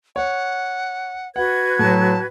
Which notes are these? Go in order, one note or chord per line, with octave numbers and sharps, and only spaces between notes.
C#5 F#5
F#4 B4 F#5 G#6
A2 F#3 A5